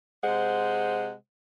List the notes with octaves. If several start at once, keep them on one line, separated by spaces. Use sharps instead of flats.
C3 G#3 C5 F#5